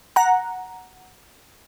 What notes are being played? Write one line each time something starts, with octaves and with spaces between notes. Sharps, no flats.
F#5 A#5